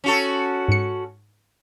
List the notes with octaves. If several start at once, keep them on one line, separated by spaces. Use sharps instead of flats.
C#4 F#4 A4
G#2 C#7